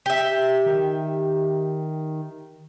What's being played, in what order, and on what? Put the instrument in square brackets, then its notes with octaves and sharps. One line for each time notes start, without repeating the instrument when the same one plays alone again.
[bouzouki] G4 E5
[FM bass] D#3